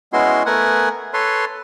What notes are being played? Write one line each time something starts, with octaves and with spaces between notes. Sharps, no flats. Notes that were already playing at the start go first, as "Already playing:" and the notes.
G#3 B3 C#4 E4 F#4 C6
A3 B3 A#4 F#5 G#5
A4 B4 C#5 C6